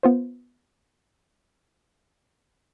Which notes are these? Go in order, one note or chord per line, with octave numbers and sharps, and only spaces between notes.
B3 F4 C5